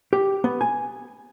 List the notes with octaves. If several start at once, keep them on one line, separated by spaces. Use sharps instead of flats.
G4
B3
G#5